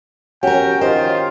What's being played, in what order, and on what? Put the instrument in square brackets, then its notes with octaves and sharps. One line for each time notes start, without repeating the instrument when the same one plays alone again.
[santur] C#4 [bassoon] F#4 [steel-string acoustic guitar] G4 A#4 [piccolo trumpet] G5
[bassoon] D#3 [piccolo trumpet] F4 [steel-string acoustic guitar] C5